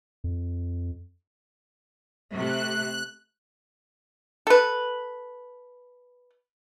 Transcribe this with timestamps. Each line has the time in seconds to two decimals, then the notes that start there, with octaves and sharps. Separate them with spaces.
0.24 F2
2.35 C3 A3 F#6
4.47 A4 B4